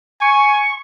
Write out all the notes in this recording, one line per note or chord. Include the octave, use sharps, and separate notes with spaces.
G#5 C#6